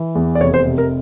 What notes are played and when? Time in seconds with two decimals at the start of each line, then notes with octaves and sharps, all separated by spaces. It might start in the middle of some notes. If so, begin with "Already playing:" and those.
Already playing: E3
0.15 E2
0.35 D5
0.40 F1 C#5
0.54 C5
0.66 C3
0.78 A#4